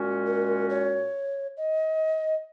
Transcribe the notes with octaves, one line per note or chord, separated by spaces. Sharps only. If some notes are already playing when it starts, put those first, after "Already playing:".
Already playing: A#2 G#3 C#4 F#4
A#4
C#5
D#5